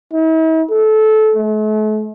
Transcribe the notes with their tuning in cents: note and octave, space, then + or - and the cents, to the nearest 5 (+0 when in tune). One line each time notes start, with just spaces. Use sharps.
E4 -45
A4 -20
A3 -45